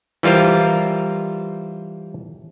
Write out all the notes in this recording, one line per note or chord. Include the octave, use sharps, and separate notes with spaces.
E3 G3 F4 A#4 C5